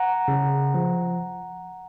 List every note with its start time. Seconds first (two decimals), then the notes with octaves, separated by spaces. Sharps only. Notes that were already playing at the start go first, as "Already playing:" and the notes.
Already playing: F#5 A#5
0.28 C#3
0.74 F3